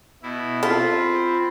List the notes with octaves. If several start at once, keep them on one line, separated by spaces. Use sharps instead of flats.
B2 E4
C4 F4 A4 B5